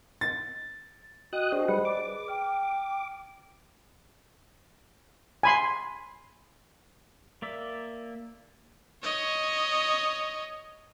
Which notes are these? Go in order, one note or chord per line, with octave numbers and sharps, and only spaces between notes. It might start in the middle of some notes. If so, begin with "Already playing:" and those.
A6
F#4 D#5 G5 D#6 F#6
D4 F#4 G#4 C5 D#5
G3 G#4 B4 F#5 B5
D5 D6
B4
G5 F6
G#5 B5 C6
A#3 D5 E5
C#5 D#5